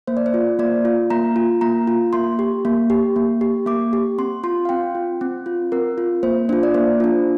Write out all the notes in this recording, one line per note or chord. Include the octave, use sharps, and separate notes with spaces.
A#3 C5
D5
C5
F4
A#3 D5
F4
A#3 A#5
F4
A#3 A#5
F4
A#3 C6
G4
A#3
G4
A#3
G4
A#3 D6
G4
C4 C6
F4 C6
F5
C4 G5
F4
C4
F4
C4 A#4
F4
A#3 C5
D4 F4 C5
D5
A#3 C5
D4 F4